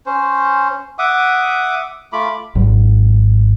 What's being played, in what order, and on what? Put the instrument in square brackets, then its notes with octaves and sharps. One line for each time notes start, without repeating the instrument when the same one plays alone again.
[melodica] C#4 C5
E5 F#5 D6 D#6
A3 F4 B5 D6
[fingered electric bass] G#1 G#2 F#3